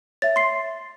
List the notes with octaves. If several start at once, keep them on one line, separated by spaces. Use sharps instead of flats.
C#5 E5 A6
C6 C7